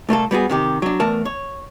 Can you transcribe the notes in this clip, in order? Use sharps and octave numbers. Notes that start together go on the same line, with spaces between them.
C2 A3 A#3 A4
G3 B3 F#4 G#4
C3 D#3 G4
F#3 D4
E2 A3 A#4 A5
C#5